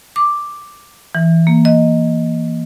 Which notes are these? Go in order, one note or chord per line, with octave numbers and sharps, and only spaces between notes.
D6
E3
A#3
D#5